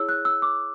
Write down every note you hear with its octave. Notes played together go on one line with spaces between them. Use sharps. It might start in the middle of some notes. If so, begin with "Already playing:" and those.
Already playing: E4 G#4 C#5 E6
F#6
E6
D6